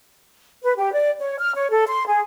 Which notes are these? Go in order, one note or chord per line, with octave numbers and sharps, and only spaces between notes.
B4
G4
D5
C#5
F6
C#5
A4
C6
G#4